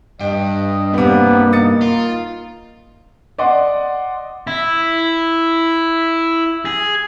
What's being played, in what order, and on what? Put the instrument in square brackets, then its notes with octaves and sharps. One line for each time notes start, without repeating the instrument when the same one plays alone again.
[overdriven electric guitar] G2 [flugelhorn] D#5 [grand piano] G5
[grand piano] C3 G3 [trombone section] A#3 [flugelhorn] B3
[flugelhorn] D#4 [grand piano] D#6 A6 C#7
[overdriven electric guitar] F4
[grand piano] D5 D#5 F#5 C6
[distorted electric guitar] E4
G#4